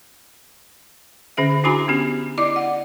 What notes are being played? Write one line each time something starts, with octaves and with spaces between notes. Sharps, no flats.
D3 C#4 G#4 E5
D4 E4 F#4 G#5 A#5
B3 C#4 G4
E4 D5 D#5 D6
F#5